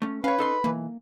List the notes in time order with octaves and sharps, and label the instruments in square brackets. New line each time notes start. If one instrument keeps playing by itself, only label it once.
[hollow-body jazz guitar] A3 C#4
[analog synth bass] C#4 [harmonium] B4 [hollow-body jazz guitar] C#5 F5
[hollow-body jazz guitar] D#4 A4 C6
[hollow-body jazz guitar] B1 E3 [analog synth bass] A#3